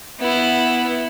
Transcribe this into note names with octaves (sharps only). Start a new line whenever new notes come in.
B3 E4